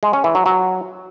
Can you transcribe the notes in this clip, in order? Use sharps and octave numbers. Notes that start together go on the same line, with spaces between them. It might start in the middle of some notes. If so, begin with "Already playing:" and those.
G#3
C#4
E3
F#3
F#3